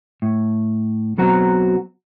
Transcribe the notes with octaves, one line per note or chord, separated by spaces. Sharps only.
A2
B1 B2 F#3 C4 F#4 A#5